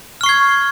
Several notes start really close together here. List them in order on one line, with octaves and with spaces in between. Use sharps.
F6 C#6 C7 G#6